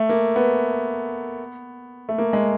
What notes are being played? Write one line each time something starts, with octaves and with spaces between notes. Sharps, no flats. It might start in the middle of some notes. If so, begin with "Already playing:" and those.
Already playing: A3
A#3
B3
A3
A#3
G#3